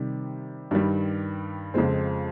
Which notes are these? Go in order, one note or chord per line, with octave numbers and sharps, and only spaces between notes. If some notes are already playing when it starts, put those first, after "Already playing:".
Already playing: C3 D#3 G3
G2 D#3 G3
F2 C#3 F3 G#3 C4